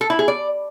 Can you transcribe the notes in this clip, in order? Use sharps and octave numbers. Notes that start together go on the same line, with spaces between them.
A4
E4
G#4
D5